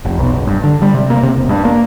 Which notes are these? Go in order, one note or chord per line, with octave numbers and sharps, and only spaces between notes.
F1
B1
F#1
G2
D3
G3
C3
A#3
C3
E1
G2
A#3